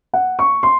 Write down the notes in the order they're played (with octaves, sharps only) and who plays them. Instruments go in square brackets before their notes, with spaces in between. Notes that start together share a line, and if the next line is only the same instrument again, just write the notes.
[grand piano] F#5
C#6
C6